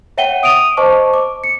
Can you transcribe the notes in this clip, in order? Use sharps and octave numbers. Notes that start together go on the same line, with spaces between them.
C#5 E5 F#5 G5 D#7 G7
D#6 D7 D#7 F7
C5 D#5 A5 C#6 D6
D6
C#7